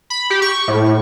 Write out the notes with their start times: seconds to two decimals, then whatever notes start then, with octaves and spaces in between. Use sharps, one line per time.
0.10 B5
0.30 G4
0.42 C#6
0.68 A2